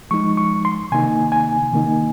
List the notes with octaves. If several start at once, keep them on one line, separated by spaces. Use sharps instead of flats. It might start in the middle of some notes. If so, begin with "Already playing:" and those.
F3 G#3 D#4 C#6
C#6
C6
C3 D#3 A#3 D#4 G#5
G#5
C3 D#3 A#3 D#4